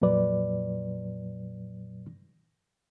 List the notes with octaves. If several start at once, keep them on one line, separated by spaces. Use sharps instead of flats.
F2 A#2 F#3 B4 D5